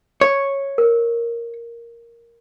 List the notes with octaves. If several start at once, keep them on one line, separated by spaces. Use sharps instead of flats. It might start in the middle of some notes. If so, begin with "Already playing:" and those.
C#5
A#4